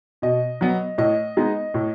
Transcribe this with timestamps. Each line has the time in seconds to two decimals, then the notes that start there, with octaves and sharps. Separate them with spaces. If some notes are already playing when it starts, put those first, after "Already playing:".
0.22 B2 D#5
0.61 F#3 B3
0.98 A2 D#5
1.37 G#3 B3 D#4
1.74 A2